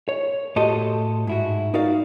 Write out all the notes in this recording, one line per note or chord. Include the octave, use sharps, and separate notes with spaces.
C#5
A2 F#4 G4 A4 D#5 C6
G#2 E4 F#4
D#4 F#4 A#4 D5 F5